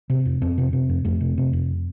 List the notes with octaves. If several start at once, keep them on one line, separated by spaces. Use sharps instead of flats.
C3
F2
F2 C4
C3
C3
F2
F2 A3
C3
C3
F2